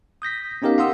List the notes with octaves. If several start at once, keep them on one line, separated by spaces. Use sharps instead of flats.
D#6 G6 A#6 B6
B3 C#4 D#4 G4 A#4 F5
F5 F#5 C6 D#6 E6